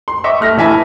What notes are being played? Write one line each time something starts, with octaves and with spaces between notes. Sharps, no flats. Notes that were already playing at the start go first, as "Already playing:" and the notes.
C6
D#5 E5 C#6 D6
A3 F6 A#6
A#1 E3 E5 G#5 A5 B5